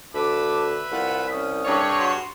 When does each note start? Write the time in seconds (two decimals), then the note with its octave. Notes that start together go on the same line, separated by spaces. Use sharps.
0.14 D2 B4 E5 A5 B5 D6
0.92 C2 F4 F#5
1.31 C#4 D#6
1.65 G2 G#4 C#5
1.98 F#4 C6